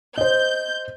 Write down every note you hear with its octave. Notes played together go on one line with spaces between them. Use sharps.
C5 D#5 G6